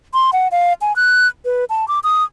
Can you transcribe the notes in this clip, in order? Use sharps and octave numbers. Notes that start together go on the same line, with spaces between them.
C6
F#5
F5
G#5
F#6
B4
A5
D6
D#6